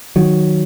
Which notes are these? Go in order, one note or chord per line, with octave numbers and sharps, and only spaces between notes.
D#3 F#3